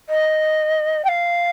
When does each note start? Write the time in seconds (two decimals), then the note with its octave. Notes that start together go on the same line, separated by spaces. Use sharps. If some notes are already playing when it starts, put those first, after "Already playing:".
0.09 D#5
1.04 G5
1.08 F5